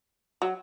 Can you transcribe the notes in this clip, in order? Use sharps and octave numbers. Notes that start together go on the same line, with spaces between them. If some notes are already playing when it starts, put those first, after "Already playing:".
F#3